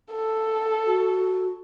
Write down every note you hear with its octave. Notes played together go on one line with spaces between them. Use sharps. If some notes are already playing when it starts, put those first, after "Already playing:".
A4
F#4